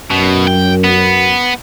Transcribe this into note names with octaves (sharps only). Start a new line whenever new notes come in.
F#2 B2
G5
B3